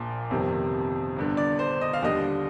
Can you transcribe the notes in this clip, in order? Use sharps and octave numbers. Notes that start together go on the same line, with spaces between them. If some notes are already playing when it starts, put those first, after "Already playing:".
Already playing: A#1 A#2 F3
G1 F2 C3 D#3 G3
G1 G2 D3
D5
C5
D#5
F5
D#2 D3 G3 D#5